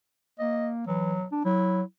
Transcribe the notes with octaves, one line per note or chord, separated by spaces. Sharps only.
A#3 D#5
E3 F#3
D4
F#3 E4